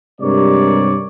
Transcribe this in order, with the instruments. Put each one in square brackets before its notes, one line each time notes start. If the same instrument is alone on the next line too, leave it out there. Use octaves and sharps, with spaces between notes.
[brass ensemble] G2 C3 G#3 A#4 C#5 D5